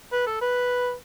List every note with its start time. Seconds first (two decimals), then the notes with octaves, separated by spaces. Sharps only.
0.13 B4
0.27 A4
0.41 B4